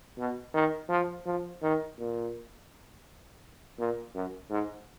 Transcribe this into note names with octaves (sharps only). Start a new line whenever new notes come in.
B2
D#3
F3
F3
D#3
A#2
A#2
F#2
G#2